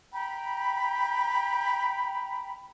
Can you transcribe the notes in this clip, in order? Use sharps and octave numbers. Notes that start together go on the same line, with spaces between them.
G5 A#5 B5